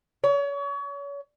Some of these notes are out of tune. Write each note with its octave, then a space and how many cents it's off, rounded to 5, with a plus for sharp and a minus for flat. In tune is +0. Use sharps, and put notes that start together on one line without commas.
C#5 +35